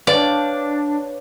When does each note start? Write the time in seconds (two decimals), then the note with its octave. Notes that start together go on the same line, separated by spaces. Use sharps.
0.07 D4 B4 C#5 D5 F5 G5 D6